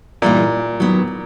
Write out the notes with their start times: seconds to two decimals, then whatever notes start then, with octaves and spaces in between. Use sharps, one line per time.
0.22 G2 A#2 E3 G3 A#3 D#4
0.80 D#2 D#3 F#3 B3